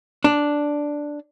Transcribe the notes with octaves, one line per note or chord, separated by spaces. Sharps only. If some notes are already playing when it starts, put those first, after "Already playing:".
D4